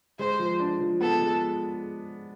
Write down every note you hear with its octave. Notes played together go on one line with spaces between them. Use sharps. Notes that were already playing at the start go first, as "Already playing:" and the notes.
G#3 C5
F3
D4
F3
B3 A4
G#3